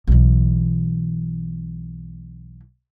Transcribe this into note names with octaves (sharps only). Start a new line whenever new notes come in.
B1 E3